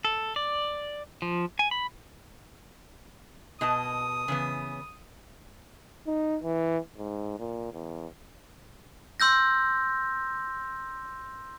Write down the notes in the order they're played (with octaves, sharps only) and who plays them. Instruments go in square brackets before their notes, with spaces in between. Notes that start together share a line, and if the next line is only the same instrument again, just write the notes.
[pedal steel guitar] A4
D5
F3
G#5
B5
[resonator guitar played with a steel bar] B2 D#5 A5 [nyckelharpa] D#6
[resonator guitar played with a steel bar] C#3 E3 B3
[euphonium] D#4
E3
G#2
A#2
E2
[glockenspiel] C6 E6 G6 A#6